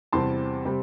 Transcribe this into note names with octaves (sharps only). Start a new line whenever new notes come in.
E2 C3 G3 C4 A5 C6
C3 G3 C4